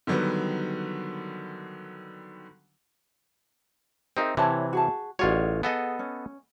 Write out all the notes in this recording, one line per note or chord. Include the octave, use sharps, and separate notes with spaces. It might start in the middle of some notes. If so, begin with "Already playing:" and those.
D3 D#3 F#3 G3 B3
C4 D#4 G#4 A#4 E5
C3 E3 E4 C#5 A5
F#4 G#4 A5
A1 F4 F#4 G#4 C#5 D5
B3 G#4 A4 D#5 F#5 G#5
C#4